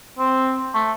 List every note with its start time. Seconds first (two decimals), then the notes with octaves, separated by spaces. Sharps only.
0.19 C4
0.74 A3